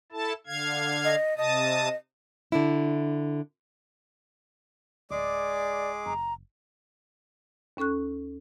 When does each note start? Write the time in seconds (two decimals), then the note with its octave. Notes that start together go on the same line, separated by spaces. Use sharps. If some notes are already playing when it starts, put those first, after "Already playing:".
0.12 E4 A4 A5
0.47 D3 F5 G#6
1.04 D#5
1.38 C3 D#5 A5 D#6
2.52 D3 D4 E4
5.11 D1 G#3 G#4 D5 D6
6.06 F#1 A#5
7.77 D#2 C#4 A4 C#6 F#6